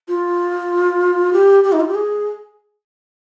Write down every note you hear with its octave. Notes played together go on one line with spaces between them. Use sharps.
F4
G4
G4
D#4
F4
G4
G#4